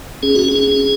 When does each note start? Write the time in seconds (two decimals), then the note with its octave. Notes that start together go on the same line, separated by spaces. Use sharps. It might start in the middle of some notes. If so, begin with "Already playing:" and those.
0.23 C#4 G#4
0.36 C#4 F#4
0.49 G#4
0.56 C#4
0.72 C#4